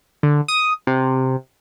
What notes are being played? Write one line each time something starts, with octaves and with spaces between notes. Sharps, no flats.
D3
D#6
C3